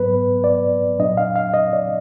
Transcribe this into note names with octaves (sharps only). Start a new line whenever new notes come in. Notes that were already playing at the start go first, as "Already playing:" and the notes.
Already playing: G#2 F#3 B3 B4
D5
A#2 F#3 D4 D#5
F5
F5
D#5
D5